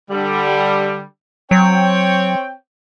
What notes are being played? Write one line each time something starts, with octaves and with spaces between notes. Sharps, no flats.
D3 G3
F#3 C4 C#5 G5